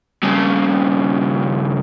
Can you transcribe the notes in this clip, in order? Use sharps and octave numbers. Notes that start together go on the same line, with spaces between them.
G2 C#3